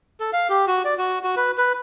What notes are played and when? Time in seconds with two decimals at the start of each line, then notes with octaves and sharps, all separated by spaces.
0.20 A4
0.33 F5
0.50 G4
0.67 F#4
0.85 D5
0.98 F#4
1.24 F#4
1.36 B4
1.58 B4